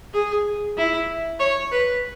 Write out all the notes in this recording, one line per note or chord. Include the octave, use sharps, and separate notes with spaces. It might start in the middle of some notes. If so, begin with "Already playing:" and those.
G#4
E4
C#5
B4